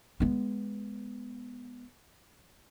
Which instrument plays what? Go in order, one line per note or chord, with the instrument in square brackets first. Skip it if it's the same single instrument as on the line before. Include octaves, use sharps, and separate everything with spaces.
[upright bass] G#3 B3